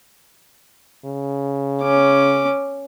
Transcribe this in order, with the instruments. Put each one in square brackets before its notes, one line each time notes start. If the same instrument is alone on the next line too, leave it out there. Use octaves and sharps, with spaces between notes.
[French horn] C#3
[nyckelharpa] C#4 D6